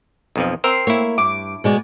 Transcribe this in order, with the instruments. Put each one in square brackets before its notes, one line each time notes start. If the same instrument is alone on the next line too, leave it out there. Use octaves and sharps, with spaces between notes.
[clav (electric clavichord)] B1 F2 F3
[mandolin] C4 C6 [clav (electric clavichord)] A#4 C5
[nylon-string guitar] A#3 [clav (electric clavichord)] E4 C#5
[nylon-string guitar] G2 [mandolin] D6
[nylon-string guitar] B2 G#3 D5